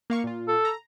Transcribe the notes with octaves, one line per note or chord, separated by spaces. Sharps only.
A#3 F5 C#6
A#2 F4
A4
A#5